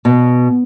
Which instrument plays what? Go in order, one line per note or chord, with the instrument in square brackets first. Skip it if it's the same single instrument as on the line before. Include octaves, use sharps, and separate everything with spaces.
[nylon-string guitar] B2